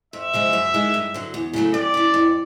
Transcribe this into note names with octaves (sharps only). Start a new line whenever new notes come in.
F2 E5
C#3 F3 G#3
F#2
D#3 G#3
G2
D3 F#3
E2
C#3 F#3 A3
F2 D5
C#3 E3
F2